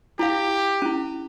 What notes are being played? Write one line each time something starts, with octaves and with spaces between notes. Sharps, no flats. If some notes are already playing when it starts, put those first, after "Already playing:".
E4 G4 F5
C#4 E4